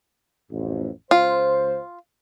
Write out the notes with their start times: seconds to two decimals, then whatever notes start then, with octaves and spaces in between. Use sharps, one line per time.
0.51 A1 F2
1.11 C#2 F4 C5